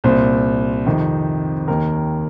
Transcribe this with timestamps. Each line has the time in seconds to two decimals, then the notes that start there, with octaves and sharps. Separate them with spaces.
0.04 C2 A#2 C5
0.86 F2 C3 D#3
1.68 D#2 D#3 A#4